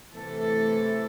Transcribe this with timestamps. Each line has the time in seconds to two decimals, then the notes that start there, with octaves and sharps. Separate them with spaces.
0.15 C3 E3 A3 A4